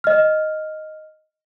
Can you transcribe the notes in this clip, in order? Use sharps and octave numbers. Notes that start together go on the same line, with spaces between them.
D#5 F6